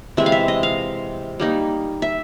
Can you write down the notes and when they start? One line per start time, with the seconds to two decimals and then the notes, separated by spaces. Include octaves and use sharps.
0.17 C3 E3 G#3 C4 E5
0.26 F5
0.32 E5
0.48 D#5
0.63 F5
1.40 G3 A#3 D#4
2.02 E5